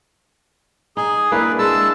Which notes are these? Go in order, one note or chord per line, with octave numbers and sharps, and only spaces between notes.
D#4 G#4
A#3 D4 E4 B4
G#3 A5 E6